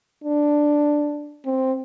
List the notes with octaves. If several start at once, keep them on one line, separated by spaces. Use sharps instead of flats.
D4
C4